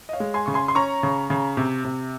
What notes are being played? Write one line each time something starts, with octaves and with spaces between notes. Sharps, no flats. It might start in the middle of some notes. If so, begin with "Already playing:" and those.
D#5
C#5 F5
G#3
G#5 C6
C#3 C#6
G#5 C6
C6
C#4 A#5 C#6
C#3
C#3
C3
C3